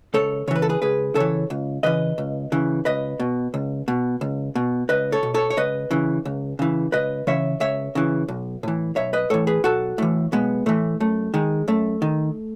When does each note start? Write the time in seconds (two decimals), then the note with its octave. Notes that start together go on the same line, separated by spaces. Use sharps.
0.14 C#2 A4 C#5
0.47 C#3 C#5
0.51 E3 B4
0.62 A4
0.69 G#4 B4
0.82 C#2 G#4 B4
1.15 C#3 E3 A4 C#5
1.50 C#2
1.83 C#3 E3 B4 D#5
2.18 C#2
2.52 C#3 E3
2.85 C#2 B4 D#5
3.20 B2
3.54 C#2
3.88 B2
4.21 C#2
4.55 B2
4.89 C#2 B4 D#5
5.12 A4 C#5
5.23 B2
5.34 A4 C#5
5.50 C#5
5.57 C#2 B4 D#5
5.91 C#3 E3
6.25 C#2
6.59 C#3 E3
6.92 C#2 B4 D#5
7.27 C#3 E3 C#5 E5
7.60 C#2 C#5 E5
7.95 C#3 E3
8.28 B1
8.63 A2 E3
8.96 B1 C#5 E5
9.13 B4 D#5
9.30 A2 E3 A4 C#5
9.47 G#4 B4
9.64 B1 F#4 A4
9.98 A2 E3
10.32 B1 G#3 B3
10.66 A2 E3 A3
11.00 F#2 A3
11.34 D#3 G#3
11.68 F#2 A3
12.02 D#3